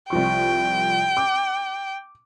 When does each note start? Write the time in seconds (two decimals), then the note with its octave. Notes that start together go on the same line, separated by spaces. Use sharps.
0.10 C2 F3 G5 C#6
1.17 D6